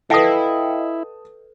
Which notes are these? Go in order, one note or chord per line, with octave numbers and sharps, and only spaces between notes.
E4 A4 B4 D#5 F5 G5 A5 D#6